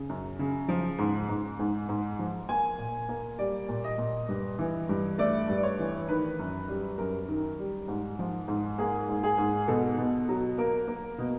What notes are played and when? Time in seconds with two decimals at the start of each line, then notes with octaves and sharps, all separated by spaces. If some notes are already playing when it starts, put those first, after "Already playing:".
Already playing: C#3
0.09 F#2
0.39 C#3
0.68 F3
0.98 G#2
1.29 G#2
1.59 G#2
1.89 G#2
2.19 F3
2.49 A#3 G#5
2.78 A#2
3.09 A#3
3.39 G3 D5
3.69 A#2
3.84 D#5
3.98 A#2
4.29 G2
4.59 E3
4.89 G2
5.18 A3 D5
5.49 G2
5.57 D5
5.63 C#5
5.79 E3
6.08 D#3 B4
6.39 F#2
6.68 G3
6.98 F#2 A#4
7.28 D#3
7.59 G3
7.88 G#2
8.19 F3
8.48 G#2
8.78 A#3 G#4
9.09 G#2
9.23 G#4
9.38 G#2
9.68 B2 A4
9.98 B2
10.29 F#3
10.58 A#3 A#4
10.87 A#3
11.18 B2